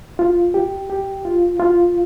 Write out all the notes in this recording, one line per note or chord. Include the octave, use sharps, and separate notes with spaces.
F4
G4
G4
F4
F4